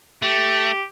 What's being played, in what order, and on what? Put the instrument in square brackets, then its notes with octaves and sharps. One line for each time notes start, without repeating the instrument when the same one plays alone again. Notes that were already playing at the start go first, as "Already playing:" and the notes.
[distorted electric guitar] A3 [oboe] G4